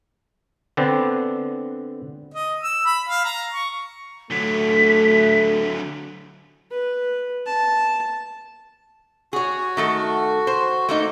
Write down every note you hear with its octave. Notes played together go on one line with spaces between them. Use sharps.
D3 B3 C4 D4
D#5
E6
B5
F5
A#5
C#6
D3 F#3 A3 B6
B4
A5
F#4 G#4 C#5
D#3 A3 A4
C5
A3 A#3 D#4